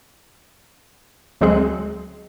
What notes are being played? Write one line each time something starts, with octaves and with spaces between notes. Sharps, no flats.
D2 F#3 G#3 C4 G#4 F#6